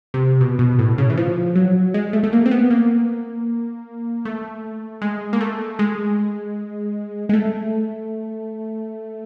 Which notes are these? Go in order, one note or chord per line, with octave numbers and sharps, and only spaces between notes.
C3
B2
B2
A2
C#3
E3
F3
F#3
G#3
A3
A3
A#3
C4
B3
A#3
A3
G#3
A#3
A3
G#3
G#3
A3